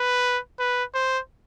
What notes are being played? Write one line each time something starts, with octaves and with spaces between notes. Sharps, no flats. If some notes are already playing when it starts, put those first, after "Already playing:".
Already playing: B4
B4
C5